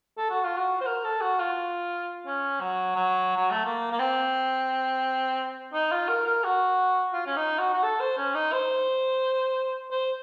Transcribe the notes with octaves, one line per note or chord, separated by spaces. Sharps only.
A4
F#4
F4
F#4
C5
A#4
A4
F#4
F4
C#4
F#3
F#3
F#3
A3
A#3
A#3
C4
D#4
F4
A#4
A#4
F#4
F4
C#4
D#4
F#4
F#4
A4
C5
C#4
D#4
C5
C5